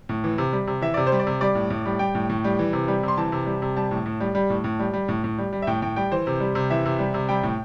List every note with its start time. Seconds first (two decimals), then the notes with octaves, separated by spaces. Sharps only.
0.09 A2
0.24 E3
0.38 C3
0.53 G3
0.67 C3
0.82 E3 E5
0.94 C3 D5
1.07 C5
1.12 G3
1.20 D5
1.27 C3
1.41 G3 D5
1.55 A2
1.70 A2
1.85 G3
1.99 G3 G5
2.15 A2
2.29 A2
2.44 G3
2.59 E3
2.73 C3
2.88 G3
3.03 C3 C6
3.17 E3 A5
3.32 C3
3.46 G3
3.62 C3
3.76 G3 A5
3.91 A2
4.06 A2
4.20 G3
4.35 G3
4.50 A2
4.64 A2
4.79 G3
4.94 G3
5.08 A2
5.24 A2
5.38 G3
5.53 G3
5.62 E5
5.67 A2 G5
5.82 A2 G5
5.96 G3 G5
6.11 E3 C5
6.27 C3
6.40 G3
6.55 C3
6.70 E3 E5
6.86 C3
6.99 G3
7.14 C3
7.29 G3 G5
7.43 A2